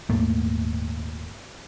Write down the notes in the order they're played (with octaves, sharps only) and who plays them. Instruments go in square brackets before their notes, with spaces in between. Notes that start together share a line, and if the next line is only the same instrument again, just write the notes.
[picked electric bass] D#1 G#2 A3 A#3